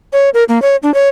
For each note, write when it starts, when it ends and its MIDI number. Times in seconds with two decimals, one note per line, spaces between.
0.13 0.30 73
0.34 0.44 70
0.49 0.61 58
0.62 0.76 73
0.83 0.93 62
0.94 1.09 73